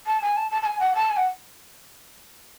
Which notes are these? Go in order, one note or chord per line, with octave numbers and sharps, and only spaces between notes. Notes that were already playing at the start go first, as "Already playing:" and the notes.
A5
G#5
A5
A5
A5
G#5
F#5
A5
G#5
F#5